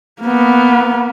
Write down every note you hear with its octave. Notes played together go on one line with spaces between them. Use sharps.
A#3 B3